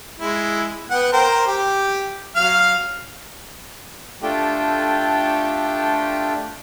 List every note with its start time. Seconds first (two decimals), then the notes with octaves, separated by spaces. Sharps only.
0.20 G#3 E4
0.90 B3 F#5 G5
1.13 A#4 C5 G5
1.46 G4
2.36 F#3 F5 F6
4.23 A3 D4 F4 G4 A4 G5